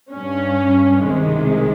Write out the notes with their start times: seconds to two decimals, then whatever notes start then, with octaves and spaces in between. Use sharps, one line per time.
0.12 G2 G3 C#4
1.04 C2 C3 D#3 G#3